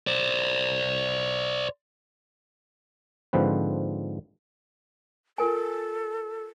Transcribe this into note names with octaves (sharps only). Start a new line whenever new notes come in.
C5 D5
G#2 D3 F3 C4 B4
F4 A4 A#4 G#5